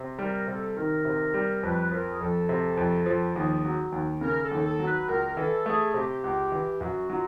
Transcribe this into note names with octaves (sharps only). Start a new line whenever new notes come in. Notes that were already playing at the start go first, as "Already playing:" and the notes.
Already playing: C3
G3 A#4
C3 A4
D#3 A#4
C3
G3
F2 B4
F3 A#4
G#4
F2 A4
C3
F2
F3
D#2 G#4
F#3
D#2
C#3 A#4
A4
D#2
A4
F#3
B4
C#2 A#4
E3 A4
A3 G#4
C3 G4
C#2
E3
F#2 F#4
F#3 F4